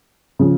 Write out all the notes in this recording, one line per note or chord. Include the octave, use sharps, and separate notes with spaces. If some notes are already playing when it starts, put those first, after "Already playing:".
C#3 F3